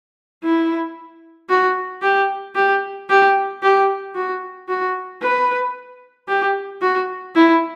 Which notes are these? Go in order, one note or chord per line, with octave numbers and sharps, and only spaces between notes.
E4
F#4
G4
G4
G4
G4
F#4
F#4
B4
G4
F#4
E4